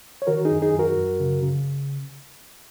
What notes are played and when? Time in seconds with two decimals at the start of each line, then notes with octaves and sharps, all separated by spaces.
0.22 C#5
0.27 D#3 F#4 A#4
0.45 D#4 G#4
0.51 F#2
0.62 D#4 G#4
0.74 F#2 F#4 A#4
0.97 F#2
1.20 C#3
1.43 C#3